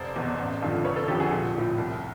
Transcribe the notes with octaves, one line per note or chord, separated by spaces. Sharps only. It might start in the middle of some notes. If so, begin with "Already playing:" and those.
Already playing: F1 C5 D5
E2 B2
A1
G2 D3 F3
F1 B4 C#5
A4 B4
F2 D3 F3 G4 A4
F#4 G#4
A#1 F4 G4
A2 F3
C2